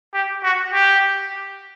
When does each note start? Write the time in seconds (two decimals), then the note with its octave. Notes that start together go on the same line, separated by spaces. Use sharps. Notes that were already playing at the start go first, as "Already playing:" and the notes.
0.14 G4
0.43 F#4
0.72 G4